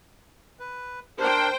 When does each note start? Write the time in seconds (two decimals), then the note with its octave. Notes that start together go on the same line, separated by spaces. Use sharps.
0.60 B4
1.19 D4 A#4 C5 G5